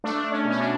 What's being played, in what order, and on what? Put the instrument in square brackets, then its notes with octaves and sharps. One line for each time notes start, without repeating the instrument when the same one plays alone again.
[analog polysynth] A3 D4
C#4
B2
C#4
D4